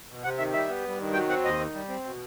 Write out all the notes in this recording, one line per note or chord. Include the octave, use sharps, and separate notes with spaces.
B2
C3 F#5
D#3 E5
G3 E5
B3
G2
D#3
F#3 G5
C4 F#5
D#2 D#5
D#3
G3
C4
B2